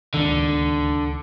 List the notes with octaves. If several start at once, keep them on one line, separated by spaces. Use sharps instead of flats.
D1 C#2 D3 D#3